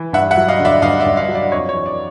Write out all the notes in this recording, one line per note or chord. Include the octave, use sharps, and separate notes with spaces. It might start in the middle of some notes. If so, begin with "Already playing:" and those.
Already playing: E3
G2 E5 F#5
E5 F#5
F#3
D#5 F5
D3
D5 E5
G2 D#5 F5
D5 E5
G2
D#5 F5
F#3
D5
F2 C#5 D#5
C#5
E3
D5